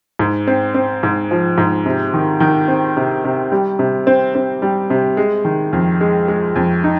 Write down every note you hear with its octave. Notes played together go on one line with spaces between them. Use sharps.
G#2
C4
C4
G#2
F3
G#2
C3
D#3
D#3
C4
C3
C3
G3
C3
C4
C4
G3
C3
G#3
D#3
F2
G#3
G#3
F2
D#4